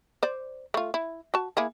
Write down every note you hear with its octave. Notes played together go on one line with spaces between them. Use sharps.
C5 D5
A3 F4
E4
F#4 A5
A#3 E4 G#4